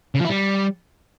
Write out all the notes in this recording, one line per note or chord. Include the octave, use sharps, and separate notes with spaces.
C#3
F3
E4
G3